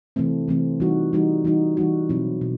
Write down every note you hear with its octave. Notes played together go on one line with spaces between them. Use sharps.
C3 E3 A3 C4
C3 E3 A3 C4
E3 G3 D#4 F#4
E3 G3 D#4 F#4
E3 G3 D#4 F#4
E3 G3 D#4 F#4
B2 F#3 C4 E4
B2